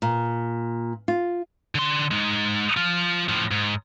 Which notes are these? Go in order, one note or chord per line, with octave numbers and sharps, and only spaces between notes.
A#2
F4
D3 C6
G#3 D#4
F3 F4
A2 F3
G#2